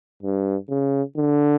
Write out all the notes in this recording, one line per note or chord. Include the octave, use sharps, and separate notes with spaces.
G2
C#3
D3